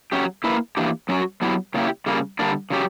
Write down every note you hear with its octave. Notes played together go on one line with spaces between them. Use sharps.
F#3 C#4 G4
A#3 E4 B4
E3 A#3 D4 G4
F#3 C#4 F#4
F#3 B3 E4 G4
C#3 F#3 A#3 E4 G4
C#3 G3 A#3
D3 G3 A#3 D4
C#3 F#3 C#4 G4